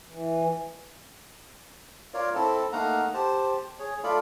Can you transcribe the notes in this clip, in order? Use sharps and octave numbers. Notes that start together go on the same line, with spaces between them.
E3
F4 A#4 C#5 D5 F5
C4 E4 A4 A5
A3 A#3 D#4 F5 F#5 A#5
G4 C5 A5
G#4 C#5
A3 F4 A4 D5 F5 B5